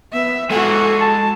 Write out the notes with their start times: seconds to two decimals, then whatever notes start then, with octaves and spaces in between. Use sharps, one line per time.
0.13 B3 E5
0.50 G#3 F#4 A4 F#5 G#5
1.01 A5